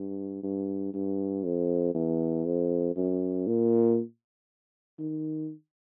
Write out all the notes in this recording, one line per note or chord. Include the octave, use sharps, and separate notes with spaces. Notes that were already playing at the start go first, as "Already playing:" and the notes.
Already playing: G2
G2
G2
F2
E2
F2
F#2
A#2
D#3